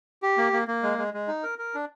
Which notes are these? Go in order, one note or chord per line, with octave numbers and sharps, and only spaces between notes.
G4
A#3
A#3
A#3
G#3
G#3
G#3
D#4
A#4
A#4
D4